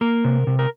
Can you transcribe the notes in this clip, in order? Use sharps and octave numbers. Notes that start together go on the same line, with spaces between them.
A#3 A#4
C3
C3
A#4